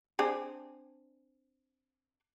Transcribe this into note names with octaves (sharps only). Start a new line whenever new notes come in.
C4 D4 G#4